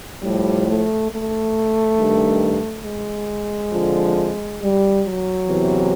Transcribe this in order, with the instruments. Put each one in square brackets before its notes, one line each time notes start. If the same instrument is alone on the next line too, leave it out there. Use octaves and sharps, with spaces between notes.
[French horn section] A2 F3 G3
A3
A3
G2 D#3
G#3
F2 D3 F3
G3
F#3
E2 C3 E3